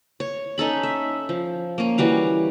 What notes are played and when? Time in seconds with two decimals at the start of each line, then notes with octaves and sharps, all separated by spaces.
0.20 C#5
0.58 C#4 D#4 A4 B5
0.83 E5
1.29 F3
1.78 A#3 C#4
1.98 E3 G3 F#4 F5